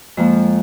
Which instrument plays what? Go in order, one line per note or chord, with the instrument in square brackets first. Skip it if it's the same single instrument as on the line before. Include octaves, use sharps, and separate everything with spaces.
[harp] F2 F3 A#3 [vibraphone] G#3